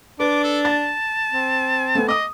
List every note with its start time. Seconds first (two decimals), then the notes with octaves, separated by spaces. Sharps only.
0.20 D4 B4 D6
0.44 A4
0.65 A5 A6
1.32 C4
1.95 A3 B3
2.08 D#5 D6 D#6